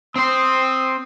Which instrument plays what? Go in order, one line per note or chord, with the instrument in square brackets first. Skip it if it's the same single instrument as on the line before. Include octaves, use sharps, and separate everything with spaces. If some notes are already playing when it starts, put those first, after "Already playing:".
[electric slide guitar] C4 C5 [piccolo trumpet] D#6